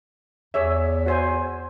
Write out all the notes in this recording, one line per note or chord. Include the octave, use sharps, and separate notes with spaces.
E2 G#4 C#5 E5
F#4 C5 G#5